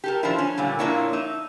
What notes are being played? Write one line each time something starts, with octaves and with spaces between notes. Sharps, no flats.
G4 A4 A#4
F3 D4 E4
C#4
A#2 D3 G3
F2 A#2 A#3 D4 E4 C#5
D#4 E5